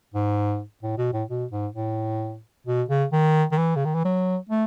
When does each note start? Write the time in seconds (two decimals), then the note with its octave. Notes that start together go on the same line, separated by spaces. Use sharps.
0.14 G#2
0.83 A2
0.98 B2
1.13 A2
1.29 B2
1.51 G#2
1.74 A2
2.67 B2
2.89 C#3
3.12 D#3
3.52 D#3
3.58 E3
3.76 C#3
3.85 D#3
3.95 E3
4.05 F#3
4.49 A3